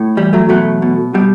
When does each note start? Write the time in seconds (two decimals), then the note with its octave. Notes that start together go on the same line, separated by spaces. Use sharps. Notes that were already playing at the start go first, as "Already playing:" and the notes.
Already playing: A2
0.17 E3 G3
0.33 F#3 A3
0.49 B2 F#3 A3
0.82 B2
1.14 B2 G3